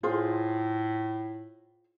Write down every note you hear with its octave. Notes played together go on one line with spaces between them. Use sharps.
A2 F4 G#4 C5